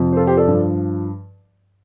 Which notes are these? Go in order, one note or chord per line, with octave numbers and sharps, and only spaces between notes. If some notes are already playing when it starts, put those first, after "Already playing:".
Already playing: F2 C3 F3
C5
F4 A4
G4 C5
A4 D5
G2 F3